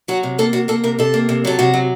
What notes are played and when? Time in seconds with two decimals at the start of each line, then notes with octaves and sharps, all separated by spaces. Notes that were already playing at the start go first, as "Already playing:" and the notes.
0.08 F#3 F#4
0.23 C3
0.39 A#3 A4
0.53 C3 F#4
0.68 A#3 A4
0.84 C3 A#4
0.99 C3 A4
1.14 A#3
1.29 C3
1.45 F#3 A4
1.59 C3 F#4
1.74 F#3